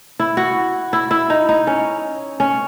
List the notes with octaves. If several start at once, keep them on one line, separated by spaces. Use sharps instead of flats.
E4
F#4
E4
E4
D#4
D#4
C#4
C#4